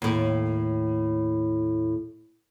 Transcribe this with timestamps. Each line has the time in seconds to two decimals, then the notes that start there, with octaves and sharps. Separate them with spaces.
0.02 D#2 A2